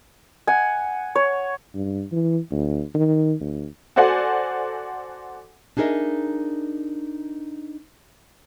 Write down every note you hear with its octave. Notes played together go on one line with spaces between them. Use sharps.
F#5 G#5
C#5
G2
E3
D2
D#3
D2
F#4 A4 C5 D5 F#5 G#5
D4 D#4 G#4 A#4 D#5 E5